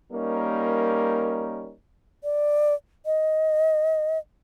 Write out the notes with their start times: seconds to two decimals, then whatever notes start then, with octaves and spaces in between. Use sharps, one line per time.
0.12 G3 A#3 C#4 D#4 A#4
2.24 D5
3.06 D#5